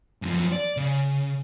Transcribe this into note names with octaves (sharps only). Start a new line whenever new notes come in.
F#2 F3
D5
C#3